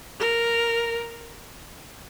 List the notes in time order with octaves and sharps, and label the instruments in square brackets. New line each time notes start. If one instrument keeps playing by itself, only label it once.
[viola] A#4